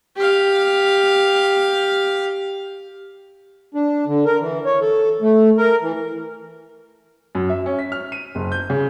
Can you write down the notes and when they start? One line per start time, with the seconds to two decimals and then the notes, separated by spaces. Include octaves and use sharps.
0.16 G4 F5
3.74 D4
4.07 D3
4.26 A#4
4.41 E3
4.65 C#5
4.81 A4
5.21 A3
5.58 A#4
5.81 E3
7.35 F#2
7.50 E5
7.66 C#4
7.79 B6
7.92 F6
8.12 D#7
8.35 F#1
8.52 G6
8.70 C#3